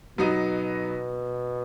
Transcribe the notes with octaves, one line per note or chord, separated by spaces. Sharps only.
B2 F#3 B3 D#4 F#4